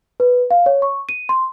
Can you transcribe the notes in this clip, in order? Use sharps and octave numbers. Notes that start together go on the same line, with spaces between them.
B4
F5
C#5
C#6
D#7
C6